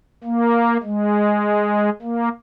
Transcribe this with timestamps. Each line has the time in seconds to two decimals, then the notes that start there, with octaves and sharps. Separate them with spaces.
0.24 A#3
0.83 G#3
2.02 A#3